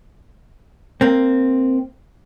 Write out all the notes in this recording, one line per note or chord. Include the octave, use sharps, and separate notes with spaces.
A#3 C4